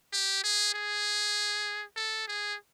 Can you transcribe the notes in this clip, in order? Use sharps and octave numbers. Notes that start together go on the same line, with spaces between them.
G4
G#4
G#4
A4
G#4